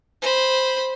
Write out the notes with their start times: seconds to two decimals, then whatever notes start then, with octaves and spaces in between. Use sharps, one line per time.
0.22 C5 B5